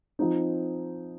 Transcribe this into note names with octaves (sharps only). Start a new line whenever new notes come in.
F3 C4 D#4